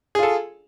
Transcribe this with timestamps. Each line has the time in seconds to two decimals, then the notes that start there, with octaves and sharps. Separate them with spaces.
0.15 G#4
0.19 F4
0.23 A4